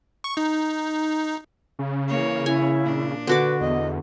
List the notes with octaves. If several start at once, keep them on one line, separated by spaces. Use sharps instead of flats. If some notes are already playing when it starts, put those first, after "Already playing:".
C#6
D#4
C#3
E3 A#3 C#5
E4 G#5
A#2 D4
D3 F#4 B4 D6
E2 D#5